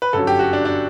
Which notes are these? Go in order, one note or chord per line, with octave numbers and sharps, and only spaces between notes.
B4
G1 F#2 F#3 A4
G4
F#4
D4
D4